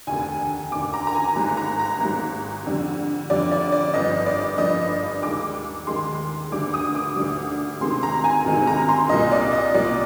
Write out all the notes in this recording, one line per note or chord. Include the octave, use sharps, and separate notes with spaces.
F1 D#2 D3 G#5
F1 D#2 D3 D6
A#5
A#5
G#5
G#1 G#2 G3 A#5
A#5
A#5
G#1 G#2 G3
F2 D3 G3
F2 D3 G3 D5
D5
D5
G1 G2 F3 D#5
D5
G1 G2 F3 D#5
D#2 D#3 G#3 D6
D#2 D#3 G#3 C6
D2 D3 G3 D6
D#6
D6
D2 D3 G3
D2 C3 D#3 G#3 C6
A#5
G#5
D2 C3 D#3 G#3
A#5
C6
C2 A#2 G3 D#5
D5
D#5
C2 A#2 G3 D5